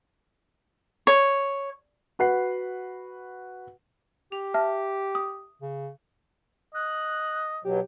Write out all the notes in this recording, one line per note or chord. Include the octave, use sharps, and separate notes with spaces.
C#5
F#4 B4 F#5 C7
G4 F7
E5 A5 F6
D#6
C#3
D#5 F#6
B2 F#3 G4